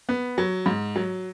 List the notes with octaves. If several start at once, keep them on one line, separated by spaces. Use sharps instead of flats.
B3
F#3
G#2
F#3